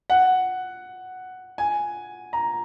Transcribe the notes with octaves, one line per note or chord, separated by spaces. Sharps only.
F#5
G#5
A#5